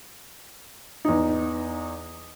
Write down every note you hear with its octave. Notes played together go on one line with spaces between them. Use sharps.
E2 D#4